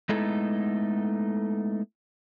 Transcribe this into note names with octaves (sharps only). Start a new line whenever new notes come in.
G#3 A3 B3 D#4 E4 A4